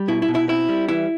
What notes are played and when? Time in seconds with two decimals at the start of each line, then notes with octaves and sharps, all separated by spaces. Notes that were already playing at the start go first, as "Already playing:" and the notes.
Already playing: G3
0.08 B2 E4
0.22 E4
0.28 B2
0.35 E4
0.48 C4 E4
0.69 G3
0.88 E3 E4